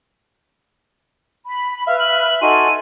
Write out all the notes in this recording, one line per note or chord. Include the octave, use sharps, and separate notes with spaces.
B5
B4 E5 F5 F6
F#7
D#4 F#4 A4 G#5 C6 D#7